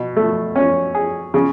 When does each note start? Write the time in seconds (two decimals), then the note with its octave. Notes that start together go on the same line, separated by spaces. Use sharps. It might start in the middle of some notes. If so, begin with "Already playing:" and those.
Already playing: B2
0.17 A3
0.56 C#4
0.95 G#4
1.34 C#3